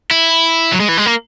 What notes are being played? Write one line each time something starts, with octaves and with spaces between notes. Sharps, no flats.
E4
F#3
G#3
E3
G#3
A#3